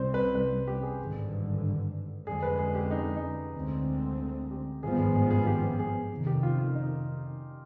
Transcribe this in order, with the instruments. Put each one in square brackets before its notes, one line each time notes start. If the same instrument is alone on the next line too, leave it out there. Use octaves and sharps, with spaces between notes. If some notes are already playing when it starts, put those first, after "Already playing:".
Already playing: [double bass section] C2 C3 G3 C4 [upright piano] C5
[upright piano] B4
B4
G4
G#4
[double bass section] G#1 G2 D3
[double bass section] F2 D3 G#3 [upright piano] G#4
[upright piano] B4
G#4
G4
D#4
D#4
[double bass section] D2 D3 G#3 C4
[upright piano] G4
[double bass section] G#1 G2 F3 G#3 B3 [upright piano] G#4
[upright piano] G#4
G#4
G#4
G4
G#4
[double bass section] F2 C3 D#3
[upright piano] G4
F4
F4
D#4